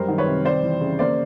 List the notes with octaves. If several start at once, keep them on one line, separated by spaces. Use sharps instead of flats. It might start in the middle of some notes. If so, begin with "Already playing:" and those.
Already playing: F#2 G3 A#4 C5
D#3
B4 C#5
C3
G3 C5 D5
E3
C#3
A#3 C5 D5